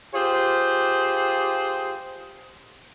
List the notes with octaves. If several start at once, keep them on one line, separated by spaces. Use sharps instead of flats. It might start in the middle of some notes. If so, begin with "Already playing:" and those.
F4 G4 G#4 C5